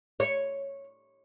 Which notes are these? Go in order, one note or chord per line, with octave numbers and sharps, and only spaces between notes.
C#5